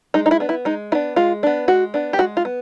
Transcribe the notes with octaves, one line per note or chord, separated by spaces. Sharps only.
G#3 D#4
D#4
E4
B3 D4
E4
G#3 D#4
B3 D4 E4
G#3 F4
B3 D4
G#3 F#4
B3 D4
G4
G#3 F#4
F4
B3